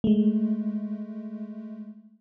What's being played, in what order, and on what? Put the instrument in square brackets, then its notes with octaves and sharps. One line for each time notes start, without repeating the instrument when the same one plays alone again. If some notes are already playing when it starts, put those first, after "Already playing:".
[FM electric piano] G#3 A3